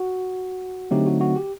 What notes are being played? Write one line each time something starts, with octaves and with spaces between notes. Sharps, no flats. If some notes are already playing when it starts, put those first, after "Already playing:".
Already playing: F#4
D3 F#3 A3 C4 D#4 G4
F#4
F#4
G4